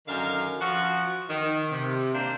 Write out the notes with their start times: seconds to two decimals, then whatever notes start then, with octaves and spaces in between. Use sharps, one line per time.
0.07 F#2 D3 D#3 A#4 F5
0.61 F3 F#4
1.29 D#3
1.71 C3
2.14 A#3 D4 C5